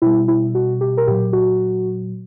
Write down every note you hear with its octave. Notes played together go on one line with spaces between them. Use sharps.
B2 G3 E4
E4
F#4
G4
A#4
A#2 F#3 G4
F#4